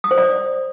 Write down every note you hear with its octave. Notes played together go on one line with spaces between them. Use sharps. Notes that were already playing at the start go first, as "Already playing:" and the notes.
D#6
C5
D5